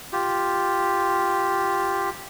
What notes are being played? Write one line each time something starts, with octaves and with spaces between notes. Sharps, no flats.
F4 G4